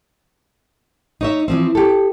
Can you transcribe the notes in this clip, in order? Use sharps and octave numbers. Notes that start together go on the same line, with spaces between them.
D#4 C#5 E5
E3 F3 C4
G4 A4